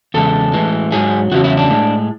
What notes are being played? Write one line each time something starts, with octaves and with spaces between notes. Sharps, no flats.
E2 C#3 G#3 A4
A2 E3 G#3
G#2 F#3 G#4
E2 C#3 F#3 F#4
E4
D4
A2 G#3